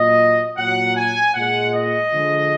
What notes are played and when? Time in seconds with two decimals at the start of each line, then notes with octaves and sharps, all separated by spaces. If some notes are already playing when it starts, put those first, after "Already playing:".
Already playing: A#2 F#3 D#5
0.57 A#2 F#3 F#5
0.96 G#5
1.35 A#2 G#3 F#5
1.74 D#5
2.13 D3 F3 G#3